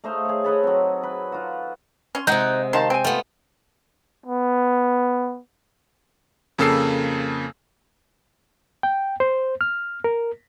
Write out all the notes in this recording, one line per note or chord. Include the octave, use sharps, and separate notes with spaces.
A3 D#4 C5 F5
G#4 C#5
A4 B4 C#5 D#5
F#3 C4
B4
F4 F#4
C#4 C6
C3 G#3 D#4 D#5 F#5 G6
D#3 F5 A5 C6
C4 G5 G#5
A3 B3 F4
B3
F2 C#3 A#3 A4 E6 C7
G5
C5
F6
A#4